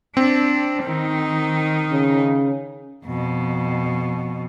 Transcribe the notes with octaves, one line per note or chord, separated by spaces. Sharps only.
C4 D4
D#3 D#4
C#3
F2 B2